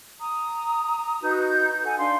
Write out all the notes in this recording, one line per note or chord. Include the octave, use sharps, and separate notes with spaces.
A#5 D#6
D#4 F#4 B4 G6
A4 F#5 G#5
D4 F5 C6